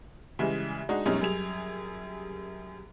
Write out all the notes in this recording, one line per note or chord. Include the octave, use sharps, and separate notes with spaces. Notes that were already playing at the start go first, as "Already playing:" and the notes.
C#3 E3 G3 G#3
G#3 D4 D#4 F#4
F#2 B2 G3 G#3 C#4 D#4
F#2 G3 G#4 F7